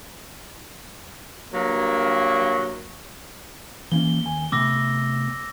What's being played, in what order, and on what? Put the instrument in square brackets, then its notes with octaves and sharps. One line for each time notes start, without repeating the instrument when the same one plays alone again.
[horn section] G2 F#3 A#3
[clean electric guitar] E3 A#3 C#4 [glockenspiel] G7
[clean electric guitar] D#2 G#5
[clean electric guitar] C3 A3 B3 [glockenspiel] D6 E6 A#6